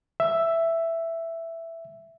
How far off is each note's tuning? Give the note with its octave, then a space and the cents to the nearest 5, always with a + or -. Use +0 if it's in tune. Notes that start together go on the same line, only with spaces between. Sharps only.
E5 +5